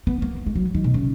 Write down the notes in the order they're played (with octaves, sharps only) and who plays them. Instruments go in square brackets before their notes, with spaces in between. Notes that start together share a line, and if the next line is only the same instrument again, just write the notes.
[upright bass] B3
A#3
G#3
F#3
D#3
B2
C#3